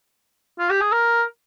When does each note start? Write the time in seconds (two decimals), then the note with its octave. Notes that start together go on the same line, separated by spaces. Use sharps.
0.59 F4
0.70 G4
0.81 G#4
0.92 A#4